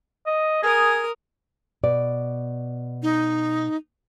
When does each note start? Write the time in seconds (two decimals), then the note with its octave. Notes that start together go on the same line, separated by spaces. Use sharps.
0.26 D#5
0.63 G#4 A#4 D#6
1.83 B2 D5
3.02 D#4